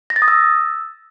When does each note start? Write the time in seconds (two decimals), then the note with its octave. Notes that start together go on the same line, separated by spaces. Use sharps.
0.10 A#6
0.16 A6
0.22 D#6
0.28 E6